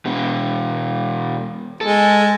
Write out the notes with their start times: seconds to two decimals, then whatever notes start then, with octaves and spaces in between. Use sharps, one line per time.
0.05 E2 B2
1.81 G#3 A4